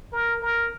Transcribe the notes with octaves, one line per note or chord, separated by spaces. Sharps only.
A#4
A#4